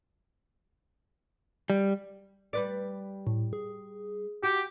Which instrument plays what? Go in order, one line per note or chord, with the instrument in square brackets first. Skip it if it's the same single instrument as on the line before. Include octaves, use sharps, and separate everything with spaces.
[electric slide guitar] G3
[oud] G3 B4 D5
[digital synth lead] A2
G#4
[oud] F#4 [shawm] G4